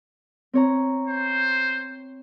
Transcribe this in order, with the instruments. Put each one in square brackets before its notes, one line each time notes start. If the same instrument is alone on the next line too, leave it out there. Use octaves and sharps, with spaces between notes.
[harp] C4 C#5 A#5
[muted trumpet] C5